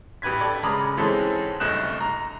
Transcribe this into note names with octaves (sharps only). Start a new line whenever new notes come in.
A1 G4 B4 G#6 B6
A4 D5 G#6
C#3 G#3 A#5 B5 D6 D#6
G#2 E3 G#3 C4 C#4 A4
F#1 C2 A3 D#5 F#6 E7
A#5